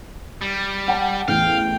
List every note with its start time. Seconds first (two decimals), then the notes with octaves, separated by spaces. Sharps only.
0.41 G3
0.88 F#5 G5 A5
1.28 A1 E2 A2 F5 G5